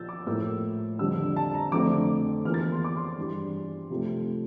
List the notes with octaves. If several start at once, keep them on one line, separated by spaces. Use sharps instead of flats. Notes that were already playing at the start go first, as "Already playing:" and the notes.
Already playing: A#2 F3 A#3 E6 G6 A6
D6
A2 F3 A#3 E4 E6
F2 D3 G3 E6
A5
A#5
F2 D3 A3 C4 F4 D6
E2 E3 A#3 F4 F6
A6
C6
D6
C6
G2 E3 G3
C3 F3 A3